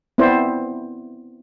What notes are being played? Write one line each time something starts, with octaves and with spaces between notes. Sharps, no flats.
B3 C4 E4 C5 D5